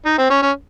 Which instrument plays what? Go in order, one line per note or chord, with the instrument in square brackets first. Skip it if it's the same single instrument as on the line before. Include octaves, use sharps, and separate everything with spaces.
[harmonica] D#4
C4
C#4
C#4